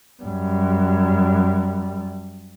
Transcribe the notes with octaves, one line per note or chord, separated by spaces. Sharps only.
F#2 G3